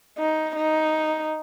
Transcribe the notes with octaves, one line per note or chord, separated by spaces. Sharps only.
D#4
D#4